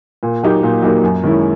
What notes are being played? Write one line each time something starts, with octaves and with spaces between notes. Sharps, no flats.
A#2
F#3 A#3 D#4 G4
A#2
F#3 A#3 D#4 G4
F#2
D#3 G#3 C#4 E4